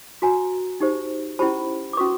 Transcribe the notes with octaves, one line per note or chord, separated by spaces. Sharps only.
F#4 B4 G#5 A#5
D#4 G4 C5
C#4 E4 G4 C5 A5 B5
D6
C#4 F#4 B4 C#6 D#6